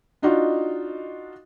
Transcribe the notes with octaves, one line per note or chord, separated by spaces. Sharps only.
D4 D#4 F4 F#4 D#5